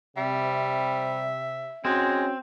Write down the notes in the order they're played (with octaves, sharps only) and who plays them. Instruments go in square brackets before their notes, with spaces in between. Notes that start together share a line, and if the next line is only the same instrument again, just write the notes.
[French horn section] C3 [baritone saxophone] G3 [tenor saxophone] E5
[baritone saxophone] G#3 [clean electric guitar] C4 [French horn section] C#4 F#4